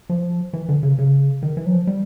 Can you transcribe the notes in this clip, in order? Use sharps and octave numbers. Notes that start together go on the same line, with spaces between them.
F3
E3
D3
C#3
C#3
D#3
E3
F#3
F3
G3